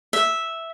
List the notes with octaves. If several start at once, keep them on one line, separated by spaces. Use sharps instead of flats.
E5